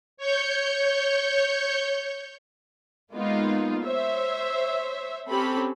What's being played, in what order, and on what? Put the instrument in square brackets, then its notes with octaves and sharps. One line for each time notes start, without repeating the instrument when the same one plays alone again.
[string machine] C#5 C#6 G6
[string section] G#3 A#3 B3 D#4 F4
C5 C#5 E5
C4 C#4 G4 A4 B5